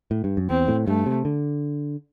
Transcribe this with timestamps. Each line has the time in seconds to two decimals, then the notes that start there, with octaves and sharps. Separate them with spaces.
0.11 A2
0.24 G2
0.37 F#2
0.50 E2 C4
0.68 A2
0.87 G2 A3
1.06 C3
1.25 D3